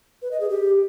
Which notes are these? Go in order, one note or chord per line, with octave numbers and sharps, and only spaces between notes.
B4
D#5
G#4
G4